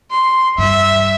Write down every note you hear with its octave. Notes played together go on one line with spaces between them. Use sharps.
C6
G2 E5